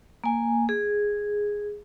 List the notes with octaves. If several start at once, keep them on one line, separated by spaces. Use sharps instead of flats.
A#3 G#5
G#4